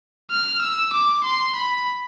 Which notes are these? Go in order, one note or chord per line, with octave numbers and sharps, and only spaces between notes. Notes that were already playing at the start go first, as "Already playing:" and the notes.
F6
E6
D6
C6
B5